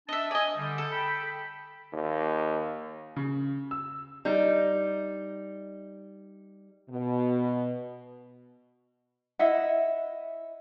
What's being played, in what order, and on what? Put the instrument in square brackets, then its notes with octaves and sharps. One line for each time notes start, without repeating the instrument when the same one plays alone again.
[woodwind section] D4 A5 [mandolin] D#5 E5
[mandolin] D5 D#5 [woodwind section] G#5
[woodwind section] D3 G3
[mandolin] A4
[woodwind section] G5 B5
[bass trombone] D#2
[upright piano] C#3
E6
[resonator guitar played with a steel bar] G3 D#4
[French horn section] B2
[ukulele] E4 D#5 E5 F#5